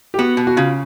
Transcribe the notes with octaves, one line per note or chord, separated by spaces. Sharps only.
G4
B3 F#4
B2
F#4
C#3 F4